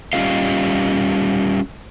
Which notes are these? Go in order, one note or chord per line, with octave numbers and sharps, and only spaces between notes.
G3 C#4 F4 G4 D#5 F5